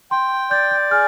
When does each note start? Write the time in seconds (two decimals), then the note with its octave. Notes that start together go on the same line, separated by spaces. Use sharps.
0.11 G5 C6
0.51 D5 G6
0.71 G6
0.91 G#4 F6